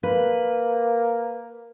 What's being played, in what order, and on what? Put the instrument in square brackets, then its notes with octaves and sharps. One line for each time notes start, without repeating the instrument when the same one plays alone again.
[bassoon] A#3 [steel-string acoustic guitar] B4